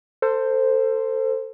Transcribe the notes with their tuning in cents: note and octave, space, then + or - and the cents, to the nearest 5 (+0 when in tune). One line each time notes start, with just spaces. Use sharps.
A4 +30 C5 +0